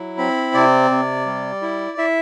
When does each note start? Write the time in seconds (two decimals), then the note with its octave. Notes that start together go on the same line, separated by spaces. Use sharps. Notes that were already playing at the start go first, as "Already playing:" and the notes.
Already playing: F#3 E4
0.18 C4 B5
0.54 C3 D5
0.91 C3
1.26 G3
1.62 E4
1.98 E4 E5